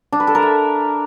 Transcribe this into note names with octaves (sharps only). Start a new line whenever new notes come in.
D4
B4
A4
A#4
E5